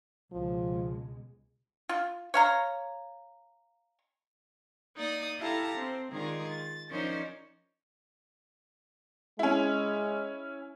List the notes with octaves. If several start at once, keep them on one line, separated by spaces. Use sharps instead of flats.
C#2 B2 F3 G#3
F4
C#5 F5 A#5
A#3 D#4 D5 D#6
E4 G4 A4 F5 A5 A#5
C4
D#3 G#3 F4 G#4 A#4 D5
A6
F3 C#4 D#4 A#4 C5 D5
G#3 C#4 E4